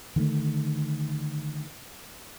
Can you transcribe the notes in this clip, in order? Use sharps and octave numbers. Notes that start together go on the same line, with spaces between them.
D3 D#3 G3 A3